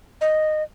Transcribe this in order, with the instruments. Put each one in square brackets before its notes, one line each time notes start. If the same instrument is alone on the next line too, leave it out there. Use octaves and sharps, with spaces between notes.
[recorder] D#5